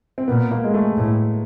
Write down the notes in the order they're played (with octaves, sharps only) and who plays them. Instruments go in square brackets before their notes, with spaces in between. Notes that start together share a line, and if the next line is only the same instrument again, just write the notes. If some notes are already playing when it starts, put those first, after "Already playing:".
[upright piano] C4
[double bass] A#2 [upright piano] B3
[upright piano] A#3
G#3
A3
[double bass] A2